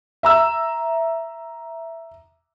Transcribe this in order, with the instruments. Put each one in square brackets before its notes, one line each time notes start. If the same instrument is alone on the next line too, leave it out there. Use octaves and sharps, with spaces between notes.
[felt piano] E5 A#5 E6